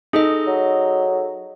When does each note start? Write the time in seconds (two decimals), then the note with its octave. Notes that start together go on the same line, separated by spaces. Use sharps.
0.13 D#4 G#4 A4 D#5
0.47 F#3